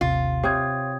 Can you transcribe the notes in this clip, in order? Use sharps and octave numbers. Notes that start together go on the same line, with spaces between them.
A1 D#2 C3 F4
C3 C#5 G5 D#6 G#6